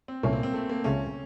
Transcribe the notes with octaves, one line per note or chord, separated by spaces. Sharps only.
C4
C2 A#2 A3 A#3 C#4
C4
C4
A3
A#3
C#2 C#3 A3 C#4